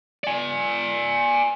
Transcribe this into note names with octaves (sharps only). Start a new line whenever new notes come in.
D5 G#5